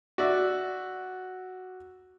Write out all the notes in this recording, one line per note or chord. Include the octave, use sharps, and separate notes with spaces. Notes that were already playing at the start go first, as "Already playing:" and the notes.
F#4 D5 E5